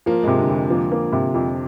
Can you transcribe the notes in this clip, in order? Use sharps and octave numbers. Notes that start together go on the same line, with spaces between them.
F3 A#3
C3 G#3
D3
F2
F3 A#3
A#3
C3
F2